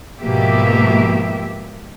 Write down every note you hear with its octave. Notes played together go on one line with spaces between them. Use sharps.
G#2 B2 F3 A#3 G4 E5